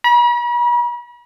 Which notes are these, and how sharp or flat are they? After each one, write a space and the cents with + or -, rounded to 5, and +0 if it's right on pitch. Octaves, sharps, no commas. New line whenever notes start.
B5 -45